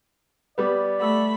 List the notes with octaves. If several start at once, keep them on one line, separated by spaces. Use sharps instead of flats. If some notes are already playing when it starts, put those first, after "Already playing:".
G3 B3 B4 D5 D6
A3 F#5 B5 E6